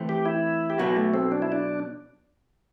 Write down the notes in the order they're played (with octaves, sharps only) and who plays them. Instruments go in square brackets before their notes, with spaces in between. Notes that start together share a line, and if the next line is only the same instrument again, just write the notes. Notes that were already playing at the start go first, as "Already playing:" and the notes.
Already playing: [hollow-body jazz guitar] E3 A3 C4
[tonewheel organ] G4
E4
G4
[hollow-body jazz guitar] B2 F#3 B3 [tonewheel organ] F#4
[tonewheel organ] A3
C4
D4
E4
D4